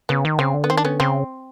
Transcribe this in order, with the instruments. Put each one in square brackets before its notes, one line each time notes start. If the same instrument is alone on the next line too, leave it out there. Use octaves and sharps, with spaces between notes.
[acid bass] C#3 [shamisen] B3
[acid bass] D#3
[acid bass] C#3 [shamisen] C4
[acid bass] D3
[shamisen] B3
[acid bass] D#3 [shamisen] C4
[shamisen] D4
[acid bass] D3 [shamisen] B3 C#4
[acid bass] C#3 [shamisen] C4